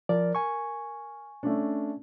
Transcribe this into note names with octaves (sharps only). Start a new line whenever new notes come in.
F3 A#4 D5
G#5 C#6
A3 C#4 D4